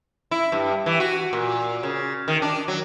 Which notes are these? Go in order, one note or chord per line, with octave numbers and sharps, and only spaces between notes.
E4
G2
E3
F#4
A#2
C#3
D#3
D4
F#3